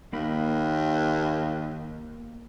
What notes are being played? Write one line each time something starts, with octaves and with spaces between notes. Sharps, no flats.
D#2 A#3 B5